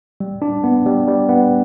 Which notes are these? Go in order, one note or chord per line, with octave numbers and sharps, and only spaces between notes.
G3
D4
B3
G3
G3
B3